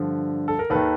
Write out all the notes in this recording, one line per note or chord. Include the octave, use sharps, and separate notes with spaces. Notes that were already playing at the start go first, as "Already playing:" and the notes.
Already playing: G2 D3 F3
A4
A#4
D#2 D#3 A4 B4